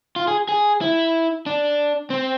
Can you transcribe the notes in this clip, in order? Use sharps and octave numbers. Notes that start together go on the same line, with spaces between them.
F4
G#4
G#4
E4
D4
C4